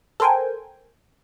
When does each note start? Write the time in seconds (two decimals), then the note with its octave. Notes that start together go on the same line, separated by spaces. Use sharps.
0.20 A4 A#4 C5 G5 G#5